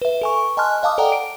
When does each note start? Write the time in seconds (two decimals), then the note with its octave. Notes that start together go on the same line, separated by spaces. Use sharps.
0.02 B4 E5
0.22 A4 G#5 C#6
0.57 D#5 G#5 A5 C6 F6 F#6
0.83 D#5 F5 A5 D6 D#6
0.98 A4 D5 F#5 G5 A#5
1.12 D7